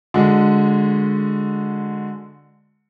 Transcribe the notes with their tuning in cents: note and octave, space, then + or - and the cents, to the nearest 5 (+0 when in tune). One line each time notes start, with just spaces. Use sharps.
D3 +0 G#3 +0 F#4 -35